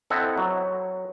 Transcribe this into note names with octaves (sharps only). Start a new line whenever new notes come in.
C4 E4 A4 D#5 F#5
F#3